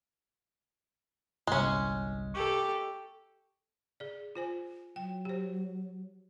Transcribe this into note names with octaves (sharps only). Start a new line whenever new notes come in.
G1 C2 G#3 C#4
G4 A4 C#6
G#4 D5
F4 C5 G#5
F#3 G5
G4 C5